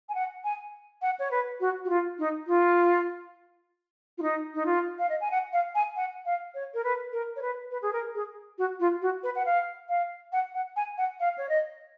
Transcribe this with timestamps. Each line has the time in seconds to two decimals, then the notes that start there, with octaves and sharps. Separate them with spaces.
0.09 G#5
0.15 F#5
0.44 G#5
1.02 F#5
1.19 C#5
1.31 B4
1.60 F#4
1.85 F#4
1.89 F4
2.19 D#4
2.47 F4
4.18 F4
4.22 D#4
4.54 D#4
4.66 F4
4.99 F5
5.09 D#5
5.21 G#5
5.31 F#5
5.53 F5
5.75 G#5
5.96 F#5
6.26 F5
6.55 C#5
6.74 A#4
6.84 B4
7.13 A#4
7.36 C#5
7.42 B4
7.71 B4
7.82 G#4
7.93 A#4
8.15 G#4
8.58 F#4
8.80 F4
9.02 F#4
9.23 B4
9.36 F#5
9.46 F5
9.89 F5
10.33 F#5
10.55 F#5
10.76 G#5
10.98 F#5
11.20 F5
11.38 C#5
11.49 D#5